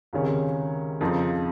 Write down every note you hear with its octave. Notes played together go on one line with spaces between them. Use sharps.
C#2 C3 D#3 G#3 C#4
F2 C#3 F3 C4 D#4